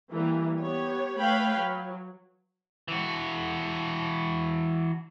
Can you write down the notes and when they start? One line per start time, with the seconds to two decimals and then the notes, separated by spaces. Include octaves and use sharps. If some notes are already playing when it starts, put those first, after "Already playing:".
0.11 E3 G3 A#3
0.58 B3 G4 C#5
1.19 A3 B4 C#5 F5 G5 B5
1.58 F#3
2.88 E3 F#4